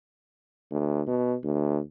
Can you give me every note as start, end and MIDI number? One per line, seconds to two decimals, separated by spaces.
0.71 1.02 38
1.07 1.35 47
1.44 1.80 38